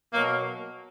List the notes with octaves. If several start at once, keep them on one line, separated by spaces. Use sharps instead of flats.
B2 F#3 A#3